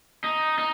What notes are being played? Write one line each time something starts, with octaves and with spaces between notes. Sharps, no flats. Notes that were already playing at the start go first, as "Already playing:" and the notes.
D#4
D#4